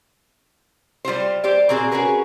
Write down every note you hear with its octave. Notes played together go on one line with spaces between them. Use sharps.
G3 F4 G4 C5
G4 C5 D5
A#2 A#3 C4 F#4 G#4
C#4 F#4 G#4 A#4 B4